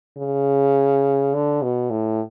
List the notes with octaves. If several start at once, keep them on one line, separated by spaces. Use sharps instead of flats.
C#3
D3
B2
A2